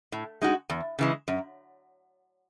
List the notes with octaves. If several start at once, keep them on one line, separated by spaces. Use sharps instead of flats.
A2
G#3 D#4 F#4
E2
C#3 E3 G#3
F#2